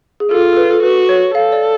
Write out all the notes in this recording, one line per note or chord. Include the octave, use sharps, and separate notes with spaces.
G#4
F4 A4
A4
B4
A4
F#4 B4
C#5
A4 F5
D5